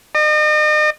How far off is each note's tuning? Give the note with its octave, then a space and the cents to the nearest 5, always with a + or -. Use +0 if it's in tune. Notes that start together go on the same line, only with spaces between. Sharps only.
D#5 -40